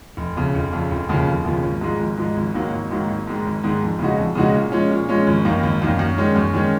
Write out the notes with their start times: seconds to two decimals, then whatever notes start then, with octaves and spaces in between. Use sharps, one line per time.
0.17 F1
0.37 F2 C#3
0.55 F1
0.73 F2 C#3
0.91 F1
1.09 D#2 C#3 F3
1.26 F1
1.45 D#2 C#3 F3
1.63 G#1
1.81 G#2 F3 G#3
1.99 G#1
2.17 G#2 F3 G#3
2.36 G#1
2.54 G#2 D#3 F#3 A#3
2.72 G#1
2.90 G#2 D#3 F#3 A#3
3.09 G#1
3.27 G#2 D#3 G#3
3.45 G#1
3.64 G#2 D#3 G#3
3.82 F2
3.99 C#3 G#3 D#4 F#4
4.18 F2
4.35 C#3 G#3 D#4 F#4
4.54 A#2
4.72 F3 G#3 C#4
4.90 A#2
5.09 F3 G#3 C#4
5.27 G#1
5.44 F#2 D#3 A#3
5.63 G#1
5.82 F#2 D#3 A#3
5.99 F#2
6.17 D#3 G#3 C#4
6.36 F#2
6.54 D#3 G#3 C#4